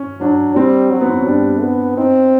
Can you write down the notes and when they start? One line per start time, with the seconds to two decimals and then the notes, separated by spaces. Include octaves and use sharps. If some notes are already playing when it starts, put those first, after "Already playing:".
Already playing: C#4
0.20 F#3 D4
0.56 G3 C4
0.91 F#3
1.01 B3
1.10 C4
1.18 C#4
1.27 G3 D4
1.62 B3
1.97 C4 D#4